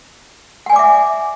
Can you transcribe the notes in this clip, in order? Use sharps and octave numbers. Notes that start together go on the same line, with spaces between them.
D5 E5 F#5 G#5 D6